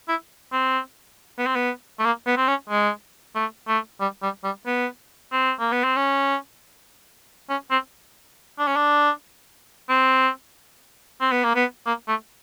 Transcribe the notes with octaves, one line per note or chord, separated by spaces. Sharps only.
E4
C4
B3
C4
B3
A3
A#3
B3
C4
C#4
G#3
A3
A3
G3
G3
G3
B3
C4
A#3
B3
C4
C#4
C#4
C4
D4
C#4
D4
C4
C4
B3
A#3
B3
A#3
A3